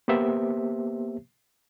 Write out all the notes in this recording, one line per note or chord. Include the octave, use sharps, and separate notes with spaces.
A#3 B3 G4 C5 E5